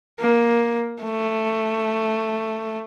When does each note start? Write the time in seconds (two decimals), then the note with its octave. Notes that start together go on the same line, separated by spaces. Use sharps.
0.20 A#3
1.02 A3